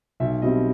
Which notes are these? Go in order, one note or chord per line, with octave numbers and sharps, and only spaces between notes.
B1 E5
B2 G3 C4 E4 D#5